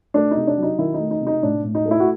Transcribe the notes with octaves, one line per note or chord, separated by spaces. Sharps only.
A3 D4
D#4
C3
D4
F#3 D#4
D#3 E4
D#4
A3
D#4
C3
D#4
A2 D4
A2
D#4
A3
E4
F#4